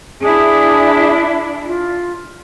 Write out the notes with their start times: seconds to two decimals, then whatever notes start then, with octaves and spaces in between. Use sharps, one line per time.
0.21 D4 E4 G#4
1.66 F4